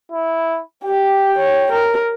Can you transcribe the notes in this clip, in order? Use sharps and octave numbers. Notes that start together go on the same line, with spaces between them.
E4
G4 G5
C#5
A#4